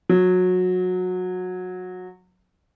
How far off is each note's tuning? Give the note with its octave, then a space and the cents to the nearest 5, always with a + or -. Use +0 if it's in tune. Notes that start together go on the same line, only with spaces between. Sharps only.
F#3 -20